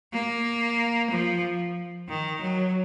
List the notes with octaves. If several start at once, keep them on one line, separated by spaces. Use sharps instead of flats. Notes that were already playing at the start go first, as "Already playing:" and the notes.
A#3
F3
D#3
F#3